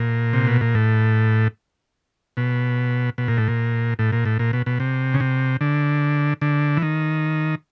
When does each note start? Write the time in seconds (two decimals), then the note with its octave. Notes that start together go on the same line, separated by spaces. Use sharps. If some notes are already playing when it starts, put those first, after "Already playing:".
Already playing: A#2
0.33 C3
0.47 B2
0.61 A#2
0.75 A2
2.37 B2
3.18 B2
3.28 A#2
3.38 A2
3.48 A#2
3.99 A2
4.12 A#2
4.25 A2
4.39 A#2
4.53 B2
4.66 B2
4.80 C3
5.14 C#3
5.20 C3
5.61 D3
6.41 D3
6.77 E3
6.82 D#3